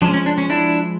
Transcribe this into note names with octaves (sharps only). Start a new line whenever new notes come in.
F3 G#3 C#4 D4
C#4
D4
C#4
D4 E4